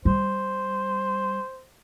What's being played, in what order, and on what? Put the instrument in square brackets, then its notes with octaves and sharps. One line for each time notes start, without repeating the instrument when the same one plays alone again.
[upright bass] G3 [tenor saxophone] C5